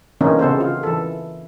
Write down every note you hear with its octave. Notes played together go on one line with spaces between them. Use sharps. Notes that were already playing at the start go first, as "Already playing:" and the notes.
D3 E3 A#3 C4 C#4 D#4
C#3 B3 C4 A4 C5
F4
E3 A4